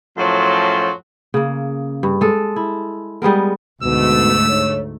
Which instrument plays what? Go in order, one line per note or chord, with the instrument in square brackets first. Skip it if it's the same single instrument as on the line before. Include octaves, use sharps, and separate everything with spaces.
[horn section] F#2 A2 F3 F#3 A5 C6
[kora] C#3 A#3
G2
G#3 A4
E4
G3 G#3 B3 A#4
[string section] D2 G#2 A3 [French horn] B2 [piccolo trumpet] E6
[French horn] C#5